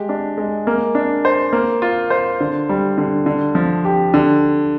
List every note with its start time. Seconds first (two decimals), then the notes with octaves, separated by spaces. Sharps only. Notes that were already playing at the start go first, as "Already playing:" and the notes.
Already playing: G#3 G4
0.09 D4
0.38 G#3
0.67 A#3
0.95 D4
1.25 C5
1.53 A#3
1.82 F4
2.10 C5
2.40 D3
2.69 G3
2.98 D3
3.26 D3
3.55 F3
3.85 G4
4.14 D3